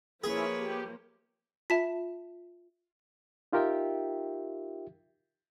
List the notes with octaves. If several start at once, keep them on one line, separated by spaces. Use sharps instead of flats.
F3 A#3 C#4 E4 G#4 B4 C#5
G4
F4 E5 A5 B6
D#4 F4 G4 A#4 E5 G5